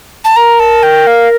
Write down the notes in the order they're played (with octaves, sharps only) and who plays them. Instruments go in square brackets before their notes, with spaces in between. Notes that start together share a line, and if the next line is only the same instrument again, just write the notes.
[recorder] A5
[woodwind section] A#4 [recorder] A#5
[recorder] A5
G5
F5